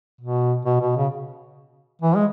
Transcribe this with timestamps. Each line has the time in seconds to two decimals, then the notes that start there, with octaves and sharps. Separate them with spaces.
0.21 B2
0.65 B2
0.81 B2
0.96 C#3
2.02 E3
2.16 G#3